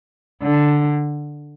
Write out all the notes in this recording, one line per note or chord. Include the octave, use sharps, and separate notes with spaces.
D3